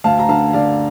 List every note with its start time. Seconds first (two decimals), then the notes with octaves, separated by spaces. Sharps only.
0.04 D2 F5 A5
0.19 A#5
0.29 D3 F5 A5
0.53 D3 D5 F5